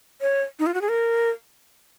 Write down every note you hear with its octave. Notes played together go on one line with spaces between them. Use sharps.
C#5
D#4
F4
F#4
G#4
A#4